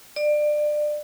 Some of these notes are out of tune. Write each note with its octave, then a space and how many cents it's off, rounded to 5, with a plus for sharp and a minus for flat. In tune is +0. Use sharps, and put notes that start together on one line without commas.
D5 +25